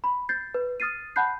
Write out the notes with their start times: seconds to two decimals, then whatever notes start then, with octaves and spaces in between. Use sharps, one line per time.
0.04 B5
0.29 G6 A6 C7
0.54 B4
0.80 D#6 F6 A6 C7 D#7
1.16 F#5 A5 B5 F#6 G6 C7